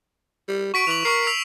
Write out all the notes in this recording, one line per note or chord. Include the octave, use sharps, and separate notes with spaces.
G3
F#4 C#6 B6 D7
E3 F7 F#7
A#4 C#6 C7
E6 B6 F7